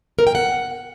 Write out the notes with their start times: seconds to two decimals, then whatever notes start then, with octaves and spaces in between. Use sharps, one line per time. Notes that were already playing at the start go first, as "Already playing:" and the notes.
0.19 A#4
0.27 G5
0.35 F#5